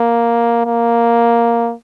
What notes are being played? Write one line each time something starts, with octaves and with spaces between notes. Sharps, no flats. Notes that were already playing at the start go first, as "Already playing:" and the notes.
Already playing: A#3
A#3